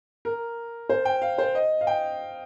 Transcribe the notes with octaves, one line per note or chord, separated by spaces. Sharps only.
A#4
C5
G5
F5
C5
D#5
F5
G5